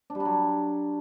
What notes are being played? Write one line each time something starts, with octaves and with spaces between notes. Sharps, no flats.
D4
G3
D4
F#3